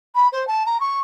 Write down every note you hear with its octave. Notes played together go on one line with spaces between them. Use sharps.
B5
C5
A5
A#5
C#6